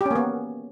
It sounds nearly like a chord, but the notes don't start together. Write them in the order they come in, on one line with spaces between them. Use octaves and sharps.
G4 C#4 A#3 B3